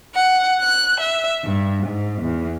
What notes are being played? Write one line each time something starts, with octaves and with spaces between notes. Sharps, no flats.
F#5
F#6
E5
G2
G#2
E2